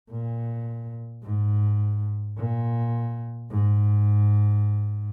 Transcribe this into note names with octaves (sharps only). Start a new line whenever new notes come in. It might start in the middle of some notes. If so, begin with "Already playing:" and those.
A#2
G#2
A#2
G#2